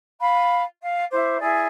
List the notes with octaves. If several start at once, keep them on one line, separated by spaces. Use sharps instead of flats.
F5 B5
F5
E4 C5 D6
E4 G#4 D5